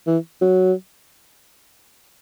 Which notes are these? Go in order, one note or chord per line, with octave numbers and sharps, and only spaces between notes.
E3
F#3